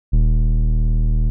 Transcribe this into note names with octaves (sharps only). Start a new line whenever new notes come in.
D#1